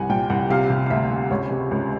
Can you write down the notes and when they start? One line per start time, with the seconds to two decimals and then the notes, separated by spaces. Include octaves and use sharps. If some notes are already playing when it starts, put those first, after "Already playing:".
Already playing: C2 F3 F#5 G#5
0.09 A#2 G5
0.30 C2 F#5
0.50 C3 F5
0.70 C3
0.86 F5
0.90 D2 E5
1.11 C3
1.31 C#2 C#5
1.51 C3
1.71 C#2